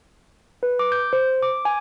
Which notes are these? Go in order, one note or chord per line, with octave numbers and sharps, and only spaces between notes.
B4
D6
G6
C5
D6
G#5